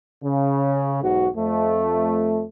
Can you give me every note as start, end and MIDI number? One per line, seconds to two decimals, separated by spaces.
0.23 1.01 49
1.03 1.28 35
1.03 1.28 44
1.03 1.28 66
1.36 2.44 41
1.36 2.44 57